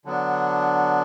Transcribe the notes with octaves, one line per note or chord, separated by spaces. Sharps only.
D3 F#3 B3 D4